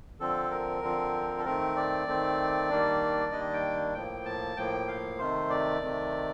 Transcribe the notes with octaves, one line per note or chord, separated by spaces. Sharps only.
D3 F3 C4 A4
A#4
D3 F3 C4
A4
D#3 A3 C4 A#4
D5
D#3 A3 C4
D#3 G3 A#3 D4
D#3 G3 A#3 D4 D#5
G5
A2 F3 A#3 G5
A5
A2 F3 A#3 G5
F5
C3 D#3 A3 C5
D5
C3 D#3 A3